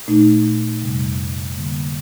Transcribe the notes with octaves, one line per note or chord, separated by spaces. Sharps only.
A#2 A3 D#4
F2 C3 G3
D3 G3 A#3